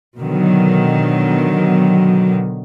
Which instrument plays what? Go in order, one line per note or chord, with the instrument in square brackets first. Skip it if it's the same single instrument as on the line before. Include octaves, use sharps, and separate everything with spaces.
[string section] B2 D3 D#3 F#3